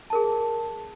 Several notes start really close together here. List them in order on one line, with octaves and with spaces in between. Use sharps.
A5 A#4 G#4